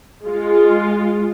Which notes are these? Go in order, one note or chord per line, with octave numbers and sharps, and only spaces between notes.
G#3 F4